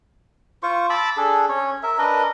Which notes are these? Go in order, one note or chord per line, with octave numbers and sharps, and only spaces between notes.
F4 C5 C#6
A5 B5 D6 E6
D4 G#4 A4
C#4 C#5
A#4 E5
D4 A#4 B4 D#5